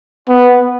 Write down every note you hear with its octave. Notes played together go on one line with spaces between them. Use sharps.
B3